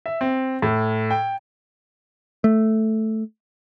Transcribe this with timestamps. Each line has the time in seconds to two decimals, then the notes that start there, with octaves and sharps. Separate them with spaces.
0.06 E5
0.21 C4
0.62 A2
1.11 G5
2.44 A3